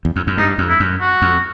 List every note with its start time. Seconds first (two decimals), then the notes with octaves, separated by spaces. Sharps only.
0.05 E2
0.16 F2
0.27 F#2
0.38 G2 D#4
0.58 F2
0.69 E4
0.80 F#2
1.01 F#4
1.22 F2